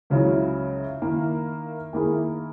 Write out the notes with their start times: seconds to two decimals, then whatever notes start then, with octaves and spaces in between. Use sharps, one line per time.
0.10 C#2 C#3 F#3 C#4 E4
1.02 D#3 A#3 E4
1.93 D#3 A#3 E4 G#4